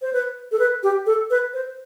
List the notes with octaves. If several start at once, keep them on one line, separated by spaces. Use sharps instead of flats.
C5
B4
A4
B4
G4
A4
B4
C5